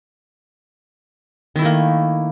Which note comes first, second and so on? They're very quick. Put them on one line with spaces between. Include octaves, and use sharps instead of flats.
D#3 E4 A3 A#3